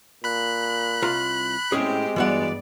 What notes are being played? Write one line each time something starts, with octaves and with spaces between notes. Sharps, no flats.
A#2 B5 F#6
C2 F4 A#5
A2 G#3 C4 C#4 G4 G#4
G2 E3 B3 F#4 D5 F#5